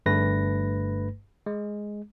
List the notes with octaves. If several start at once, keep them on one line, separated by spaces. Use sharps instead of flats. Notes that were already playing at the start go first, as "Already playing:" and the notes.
G1 G2 A3 B4 A#6
G#3